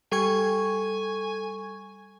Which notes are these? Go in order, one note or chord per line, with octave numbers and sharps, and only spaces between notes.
G3 A4 G#5 C#6 G#6